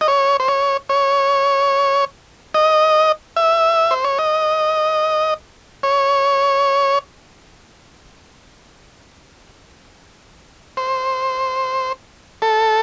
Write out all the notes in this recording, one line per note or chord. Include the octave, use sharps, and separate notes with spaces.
D#5
C#5
C5
C#5
C#5
D#5
E5
C5
C#5
D#5
C#5
C5
A4